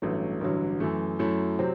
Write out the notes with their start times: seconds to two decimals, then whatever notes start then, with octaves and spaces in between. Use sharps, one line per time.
0.02 A1 G2 F#3 A3
0.41 A1 G2 D3 F#3
0.80 F#2 E3 A3
1.19 F#2 F#3 A3 E4
1.59 C3 F#3 C4